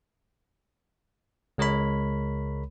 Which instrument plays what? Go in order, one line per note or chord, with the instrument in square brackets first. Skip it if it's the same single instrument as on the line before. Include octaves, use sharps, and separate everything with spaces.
[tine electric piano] C#2 G#3 A#4 C#5 B5